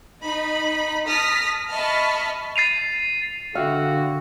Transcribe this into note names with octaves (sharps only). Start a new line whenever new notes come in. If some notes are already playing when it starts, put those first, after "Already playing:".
D#4 B5
A5 D#6 F6 A#6 B6
D#5 E5 A5 B5 C#6 F6
A6 C7 D#7 F7
D3 F#4 E5 F5 G5 E6